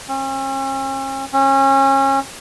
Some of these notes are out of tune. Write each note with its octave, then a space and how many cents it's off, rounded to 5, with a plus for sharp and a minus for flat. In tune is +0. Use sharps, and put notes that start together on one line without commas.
C#4 -45
C#4 -30